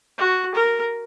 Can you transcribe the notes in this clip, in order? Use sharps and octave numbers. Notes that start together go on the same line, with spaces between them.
F#4
A#4